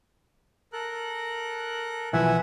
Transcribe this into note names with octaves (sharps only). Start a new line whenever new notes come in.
A4 A#4 F#6
B1 E3 F3 E5 F#5 G#5